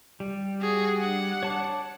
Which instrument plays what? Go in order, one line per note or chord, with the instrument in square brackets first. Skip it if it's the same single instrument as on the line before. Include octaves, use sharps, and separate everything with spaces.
[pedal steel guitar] G3
[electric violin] F#4 G#4
D4 F#5
[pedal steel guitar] C#5 A5 D6